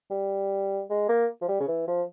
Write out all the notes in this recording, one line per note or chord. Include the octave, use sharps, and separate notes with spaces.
G3
G#3
A#3
F3
G3
C#3
E3
F3